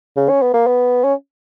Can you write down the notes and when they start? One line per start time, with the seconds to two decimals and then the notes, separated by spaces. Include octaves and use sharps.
0.17 C#3
0.29 C#4
0.42 B3
0.54 A#3
0.67 B3
1.04 C#4